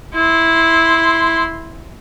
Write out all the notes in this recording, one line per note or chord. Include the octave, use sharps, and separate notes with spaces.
E4 C6